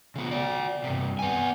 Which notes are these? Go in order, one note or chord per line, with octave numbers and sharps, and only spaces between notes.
C#3 B3
F#4 D5
G2 C3
B3 G#5